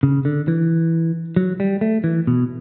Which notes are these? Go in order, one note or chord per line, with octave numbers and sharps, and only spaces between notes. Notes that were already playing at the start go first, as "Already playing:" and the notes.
C#3
D3
E3
F#3
G3
A3
E3
B2